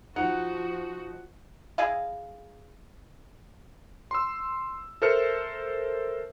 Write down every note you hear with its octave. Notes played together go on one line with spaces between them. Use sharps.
F3 D#4 F#4 F#5
E4 G#4 D#5 F5
C6 E6
A4 A#4 C5 E5 F6 C#7